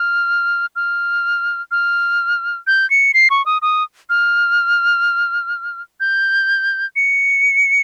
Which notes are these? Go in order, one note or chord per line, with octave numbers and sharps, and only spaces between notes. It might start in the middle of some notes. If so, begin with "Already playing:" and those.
Already playing: F6
F6
F6
G6
C#7
C7
C#6
D#6
D#6
F6
G6
C#7